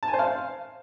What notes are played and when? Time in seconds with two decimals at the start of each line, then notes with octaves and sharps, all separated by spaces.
0.03 A5
0.08 G#5
0.14 C5
0.19 F5